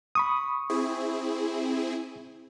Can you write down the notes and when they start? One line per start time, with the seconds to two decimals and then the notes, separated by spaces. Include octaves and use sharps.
0.15 B5 C#6 D#6
0.70 C4 E4 G#4